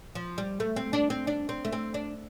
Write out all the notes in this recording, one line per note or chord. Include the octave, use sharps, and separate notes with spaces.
F3
G3
A3
C4
D4
C4
D4
C4
A3
C4
D4